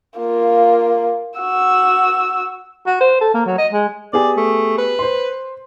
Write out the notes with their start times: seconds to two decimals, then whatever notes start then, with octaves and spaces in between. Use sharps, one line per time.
0.18 A#3 F4
1.39 F#4 E6
2.86 F#4
3.00 C5
3.21 A4
3.34 A#3
3.46 F#3
3.58 D#5
3.72 G#3
4.13 B3 G4 G#4 D5
4.37 A3
4.78 B4
4.99 C5 C6